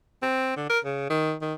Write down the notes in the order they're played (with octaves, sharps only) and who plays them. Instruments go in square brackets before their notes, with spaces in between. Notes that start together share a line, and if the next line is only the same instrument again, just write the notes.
[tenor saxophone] C4
D3
A#4
C#3
D#3
D#3